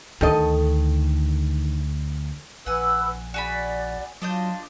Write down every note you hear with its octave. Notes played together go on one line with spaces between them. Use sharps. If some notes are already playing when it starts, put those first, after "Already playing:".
D2 D#3 A4 D#5
A#1 B4 F#5 G#5 E6
F#4 G#4 D5 B5
F#3 D4 F4 D#5 G6